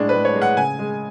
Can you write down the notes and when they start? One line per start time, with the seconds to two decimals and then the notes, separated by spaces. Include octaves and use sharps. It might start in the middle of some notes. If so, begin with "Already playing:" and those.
Already playing: A2 G#3 D4
0.09 B4
0.14 A2
0.25 C#5
0.36 G#3
0.42 F#5
0.57 C#3 G#5
0.79 G#3